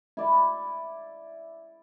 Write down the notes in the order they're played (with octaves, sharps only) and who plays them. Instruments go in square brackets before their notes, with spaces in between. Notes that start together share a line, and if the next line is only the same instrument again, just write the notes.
[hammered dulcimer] E4 D5